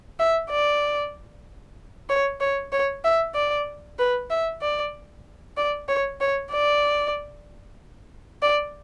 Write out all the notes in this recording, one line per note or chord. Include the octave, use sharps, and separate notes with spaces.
E5
D5
C#5
C#5
C#5
E5
D5
B4
E5
D5
D5
C#5
C#5
D5
D5